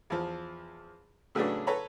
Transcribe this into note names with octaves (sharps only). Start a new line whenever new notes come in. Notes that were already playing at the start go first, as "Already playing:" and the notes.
E2 F3
A2 C#3 F#3 A3 B3 D4
A4 B4 C#5 A#5 B5